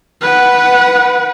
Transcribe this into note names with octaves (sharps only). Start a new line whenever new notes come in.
B4 F#5